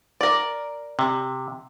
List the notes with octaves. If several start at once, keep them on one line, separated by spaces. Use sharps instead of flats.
A#4 D5
C3